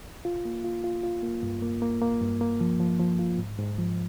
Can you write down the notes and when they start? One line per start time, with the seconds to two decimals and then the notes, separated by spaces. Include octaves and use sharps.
0.25 F4
0.45 A#3
0.64 F4
0.84 F4
1.03 F4
1.23 A#3
1.43 G2
1.62 A#3
1.82 A#3
2.02 A#3
2.21 G2
2.41 A#3
2.60 F3
2.80 F3
2.99 F3
3.19 F4
3.38 G#2
3.58 G#2
3.78 F3